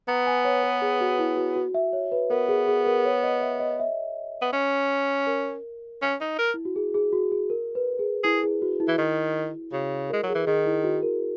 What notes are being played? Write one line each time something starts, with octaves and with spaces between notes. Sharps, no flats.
B3 A#5
G#5
C#5
B4
G#4
F#4
E4
F#4
F#4
E5
C#5
B4
B3 A#4
G#4
G#4
A#4
C#5
D#5
E5
D#5
E5
B3
C#4
A#4
C#4
D#4
A#4
E4
F#4
G#4
G#4
F#4
G#4
A#4
B4
G#4
E4 G#4
G#4
F#4
E4
E3
D#3
C#3 F#4
A#4
G#3
F#3
G#4
E3
D#3 G#4
E4
F#4
A#4